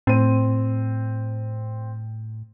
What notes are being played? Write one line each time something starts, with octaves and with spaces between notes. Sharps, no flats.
A2 C4 D#7